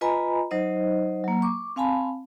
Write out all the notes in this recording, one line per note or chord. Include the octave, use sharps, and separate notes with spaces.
F4 B4 D#5 G#5 A#5 B5
F#3 D#4 C5 D#5
F#3 A#3
C#6 D6
C4 F5 G#5 A5 B5